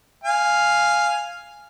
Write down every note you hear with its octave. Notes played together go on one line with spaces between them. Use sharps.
F5 G#5